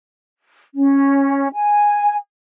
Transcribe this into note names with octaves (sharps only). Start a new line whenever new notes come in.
C#4
G#5